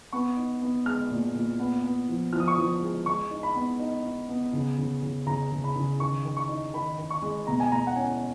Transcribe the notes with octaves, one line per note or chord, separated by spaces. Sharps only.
B3 C#6
D#4
B3
G#3 F6
A#2
A#2
B3
B3
F3
F3 F6
D#6
C#6
F3 D#6
G#3
G#3 C#6
D#4
B5
B3
D#4
D#4
B3
C#3
C#3
C#3
C#3 A#5
C#3
B5
C#3
D#3 C#6
D#3
C#6
D#4
D#3 B5
D#3
C#6
G#3
B2 A#5
G#5
B2 A#5
F#5
C#4 G#5